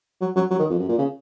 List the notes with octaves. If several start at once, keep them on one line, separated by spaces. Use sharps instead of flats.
F#3
F#3
F#3
D#3
F2
F#2
A#2
C#3